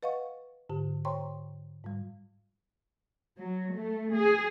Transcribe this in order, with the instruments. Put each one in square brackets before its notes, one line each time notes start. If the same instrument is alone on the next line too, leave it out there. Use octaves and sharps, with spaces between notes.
[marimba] B4 D#5 F5 F#5 C#6
G#2 D3 G4
C5 C#5 G5 A#5 C6 C#6
G#2 G3
[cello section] F#3
A3
G#4